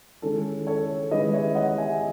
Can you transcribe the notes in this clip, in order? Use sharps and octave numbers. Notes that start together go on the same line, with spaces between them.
D#3 G#3 C#4 E4 A4
A4 C#5
D#3 G#3 C#4 E4 B4 D#5
C#5 E5
D#5 F#5
E5 G#5